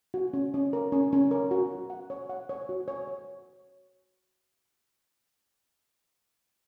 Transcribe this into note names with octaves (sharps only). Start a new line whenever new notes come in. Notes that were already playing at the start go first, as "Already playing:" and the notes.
F#4
C#4
C#4
A#4
C#4
C#4
A#4
F#4
F#4
F#5
C#5
F#5
C#5
F#4
C#5
C#5